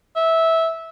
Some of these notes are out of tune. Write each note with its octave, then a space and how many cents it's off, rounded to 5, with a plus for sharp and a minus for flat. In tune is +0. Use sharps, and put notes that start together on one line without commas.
E5 -15